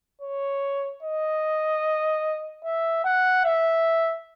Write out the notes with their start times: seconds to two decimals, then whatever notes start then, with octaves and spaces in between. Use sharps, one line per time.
0.21 C#5
1.03 D#5
2.64 E5
3.04 F#5
3.45 E5